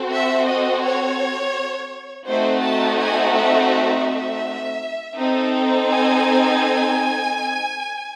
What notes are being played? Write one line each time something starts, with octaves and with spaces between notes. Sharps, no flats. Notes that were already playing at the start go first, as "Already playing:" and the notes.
Already playing: C4 F#4 A4
E5
D#5
C#5
A3 C4 D#4 F#4 C5
A5
G#5
E5
E5
C4 D#4 A4
G#5